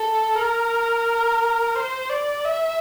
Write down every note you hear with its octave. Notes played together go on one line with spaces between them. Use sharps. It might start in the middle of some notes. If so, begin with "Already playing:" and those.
Already playing: A4
A#4
C5
D5
E5